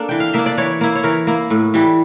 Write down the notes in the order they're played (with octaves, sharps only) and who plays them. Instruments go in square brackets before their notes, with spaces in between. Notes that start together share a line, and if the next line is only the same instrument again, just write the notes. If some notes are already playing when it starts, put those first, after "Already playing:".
Already playing: [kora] A#3 D4 A4
E3 G5
F5
A#3 D4 E5
D5
E3 C#5
A#3 E4
C#5
E3 A#4
A#3 E4
A2
E3 G3